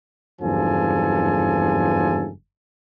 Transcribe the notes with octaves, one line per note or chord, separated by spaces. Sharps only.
F#1 E2 G2 F3 A4 G#5